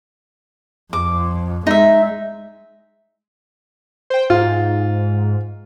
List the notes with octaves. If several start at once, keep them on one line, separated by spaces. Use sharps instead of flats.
F2 D6
G#3 D#4 E5
C5 G5
G#2 F4